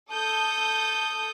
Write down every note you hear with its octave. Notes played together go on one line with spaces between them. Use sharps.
A4 D#6 G6